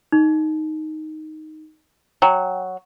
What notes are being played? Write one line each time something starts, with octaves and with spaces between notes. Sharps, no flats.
D#4
F#3 G5